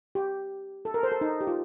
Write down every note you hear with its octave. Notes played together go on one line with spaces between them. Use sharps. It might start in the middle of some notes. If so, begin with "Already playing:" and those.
G4
A4
A#4
C5
A4
D#4
G4
F4